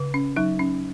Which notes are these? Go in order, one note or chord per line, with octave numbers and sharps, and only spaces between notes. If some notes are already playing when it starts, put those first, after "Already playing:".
Already playing: C#3
C#4
F#3 D#4
C#4